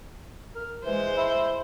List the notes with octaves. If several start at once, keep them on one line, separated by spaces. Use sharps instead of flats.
A#4
E3 G#3 C5
E4